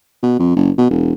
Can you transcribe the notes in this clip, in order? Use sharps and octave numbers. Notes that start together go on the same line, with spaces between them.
B2
F2
F#1
B2
E1